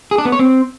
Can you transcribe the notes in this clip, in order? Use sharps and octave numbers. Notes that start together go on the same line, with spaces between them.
G#4
D4
B3
C#5
C4